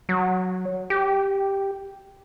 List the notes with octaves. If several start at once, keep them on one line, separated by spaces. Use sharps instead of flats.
F#3
G4